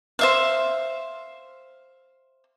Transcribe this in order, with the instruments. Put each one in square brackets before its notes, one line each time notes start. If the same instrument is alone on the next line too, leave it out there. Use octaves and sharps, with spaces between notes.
[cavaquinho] C5 E5 F5